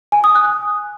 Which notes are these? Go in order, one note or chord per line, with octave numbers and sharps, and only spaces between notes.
G#5
D#6
F#6